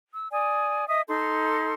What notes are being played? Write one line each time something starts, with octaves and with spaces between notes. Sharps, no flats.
E6
D5 G#5 D#6
D#5 E5 D#6
D#4 A4 C6